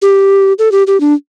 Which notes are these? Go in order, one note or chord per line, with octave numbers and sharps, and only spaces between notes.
G4
A4
G4
G4
D4